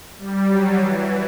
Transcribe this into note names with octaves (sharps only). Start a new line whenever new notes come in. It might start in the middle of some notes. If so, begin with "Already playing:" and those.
G3
F#3
E3